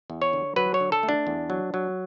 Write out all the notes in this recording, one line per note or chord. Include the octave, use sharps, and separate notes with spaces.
E2
C#5
D3
F#3 B4
C#5
D3
A4
A3
D4
E2
F#3
F#3